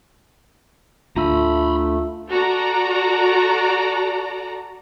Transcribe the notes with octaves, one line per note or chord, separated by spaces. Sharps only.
D2 D3 A3 F4 A#5 B5 E6
F#4 A4 D5 A#5